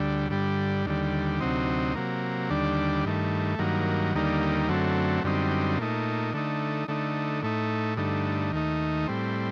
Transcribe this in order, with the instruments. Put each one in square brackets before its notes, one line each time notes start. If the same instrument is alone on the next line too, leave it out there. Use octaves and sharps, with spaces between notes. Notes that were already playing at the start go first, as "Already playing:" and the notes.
Already playing: [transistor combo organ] D2 D3 G3
G2 D3 G3
D#2 D3 G3
D2 C3 F#3 C4 D#4
C3 F#3 A#3
D#2 D3 G3 D4
G2 D#3 A3
G2 D#3 F#3 A#3
D#2 D3 G3 A#3 D#4
F#2 D3 F#3 A3 C4
F#2 D3 G3 C4 D#4
A#2 A3 D#4
D3 A3 D#4
D3 A3 D#4
A2 A3 D#4
G2 D3 A3 D#4
D#2 D#3 A3 D#4
A2 G3 C4